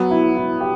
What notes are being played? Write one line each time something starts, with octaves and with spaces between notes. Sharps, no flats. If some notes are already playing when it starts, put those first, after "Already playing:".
Already playing: F#3 B3
E4
E4
G4